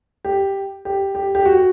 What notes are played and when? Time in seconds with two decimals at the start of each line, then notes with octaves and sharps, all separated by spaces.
0.25 G4
0.85 G4
1.15 G4
1.35 G4
1.45 F#4